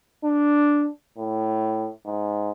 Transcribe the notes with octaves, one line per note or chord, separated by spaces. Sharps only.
D4
A2
G#2